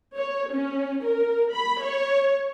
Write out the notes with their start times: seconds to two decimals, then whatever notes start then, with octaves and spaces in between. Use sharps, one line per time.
0.16 C#5
0.52 C#4
1.05 A#4
1.54 B5
1.82 C#5